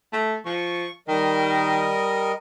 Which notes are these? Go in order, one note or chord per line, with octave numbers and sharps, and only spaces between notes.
A3
F3 C#6
D#3 G3 A#4 D#5